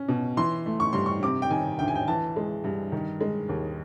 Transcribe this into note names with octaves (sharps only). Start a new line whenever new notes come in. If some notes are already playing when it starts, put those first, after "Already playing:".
Already playing: C#4
B2
E3 C6
A3
C#6
G2 C6
C#6
C3 D6
G5
D#3 G#5
D2 G5
G#5
G5
E3 A5
G#3
G2
D#3
G#3
D#2